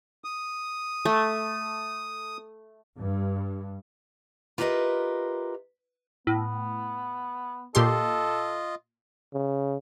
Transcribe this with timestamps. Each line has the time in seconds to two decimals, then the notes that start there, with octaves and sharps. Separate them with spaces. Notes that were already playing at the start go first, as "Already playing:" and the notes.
0.24 D#6
1.05 A3
3.00 G2
4.58 F4 G4 A#4 B4 D#5 E5
6.27 A2 B3
7.75 A#2 F4 G4 A4 D#5 C6
9.34 C#3